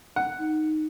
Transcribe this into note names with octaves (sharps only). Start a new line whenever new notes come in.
F#5
D#4